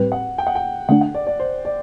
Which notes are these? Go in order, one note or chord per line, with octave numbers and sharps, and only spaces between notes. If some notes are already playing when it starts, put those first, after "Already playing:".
Already playing: A2 G3 C4 G4 B4
F#5
G5
F#5
G5
D3 A3 D4 F#5
F#5
D5
D5
C5
D5